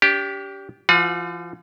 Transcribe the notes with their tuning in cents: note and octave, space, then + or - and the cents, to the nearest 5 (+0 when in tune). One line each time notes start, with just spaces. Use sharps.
D4 -40 G4 +0
F3 -45 F4 +45 F#5 -25